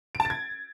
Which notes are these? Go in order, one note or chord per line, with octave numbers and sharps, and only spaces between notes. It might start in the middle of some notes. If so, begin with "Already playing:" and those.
D7
A5
A6
G#6